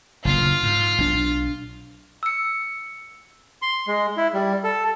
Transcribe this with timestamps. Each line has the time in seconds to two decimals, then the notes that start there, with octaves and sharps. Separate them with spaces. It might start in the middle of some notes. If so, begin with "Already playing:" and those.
0.25 F#1 D2 A#2 F4 F5
0.63 G#2
0.98 B1 D4
2.23 E6 C#7
3.62 C6
3.87 G#3
4.17 E4
4.34 G3
4.64 A4